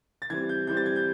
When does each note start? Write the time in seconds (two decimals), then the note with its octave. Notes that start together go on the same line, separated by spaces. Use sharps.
0.22 A6
0.30 E3 G3 C4 G#6
0.49 G6
0.67 E3 G3 C4 G6
0.77 A6
0.86 G#6
0.96 G6